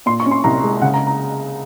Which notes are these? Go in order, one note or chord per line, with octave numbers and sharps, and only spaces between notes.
A#2 C6
C#6
C#4
C6
C2 A#5
G#3
C#3 F#5
A#5
A#5